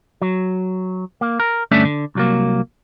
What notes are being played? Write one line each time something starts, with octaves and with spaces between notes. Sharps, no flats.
F#3
A#3
A#4
D2 G2 A3 C#4 D4 E5
D3
C2 F#3 A#3